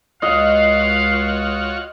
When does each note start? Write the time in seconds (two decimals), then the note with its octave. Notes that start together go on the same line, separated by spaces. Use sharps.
0.22 C#2 F4 F#4 C#5 D#5 F5